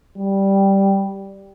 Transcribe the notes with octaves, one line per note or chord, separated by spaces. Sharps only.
G3